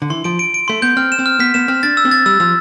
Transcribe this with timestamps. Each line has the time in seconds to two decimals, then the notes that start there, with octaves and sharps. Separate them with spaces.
0.02 D3
0.10 E3 C6
0.24 F3 D7
0.39 D7
0.54 D7
0.68 A3 C6
0.82 B3 G6
0.97 C4 F6
1.12 E7
1.19 C4
1.26 F6
1.39 B3 B6
1.54 B3 E7
1.68 C4 F6
1.83 D4 A6
1.97 E6
2.05 C4
2.11 A6
2.26 G3 E6
2.40 F3 E6